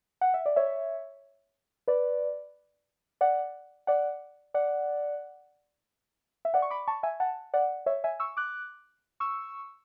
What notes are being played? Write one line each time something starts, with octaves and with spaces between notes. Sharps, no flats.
F#5
E5
D5
C#5 E5
B4 D5
D5 F#5
D5 F#5
D5 F#5
E5
D5 F#5
C#6
B5 D6
A5 C#6
E5 G#5
F#5 A5
D5 F#5
C#5 E5
E5 G#5
C#6 E6
D6 F#6
C#6 E6